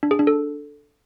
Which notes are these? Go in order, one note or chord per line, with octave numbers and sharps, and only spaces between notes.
D4
G#4
D4
A4